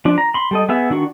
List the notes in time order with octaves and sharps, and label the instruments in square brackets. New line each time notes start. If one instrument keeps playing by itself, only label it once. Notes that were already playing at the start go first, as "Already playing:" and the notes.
[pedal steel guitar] F3 D4
A#5
B5 C6
G3 A4 D#5
B3 G#4 E5
D#3 D4 F#4 C#6